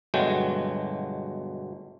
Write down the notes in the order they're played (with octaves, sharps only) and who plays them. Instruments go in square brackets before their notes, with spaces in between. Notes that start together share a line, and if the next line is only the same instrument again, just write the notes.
[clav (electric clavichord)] G1 B2 F#3 G#3 A3 G5